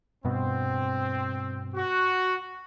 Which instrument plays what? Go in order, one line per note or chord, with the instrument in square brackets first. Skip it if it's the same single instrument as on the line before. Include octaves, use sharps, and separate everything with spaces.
[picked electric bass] G2 B2 [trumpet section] C4
[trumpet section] F#4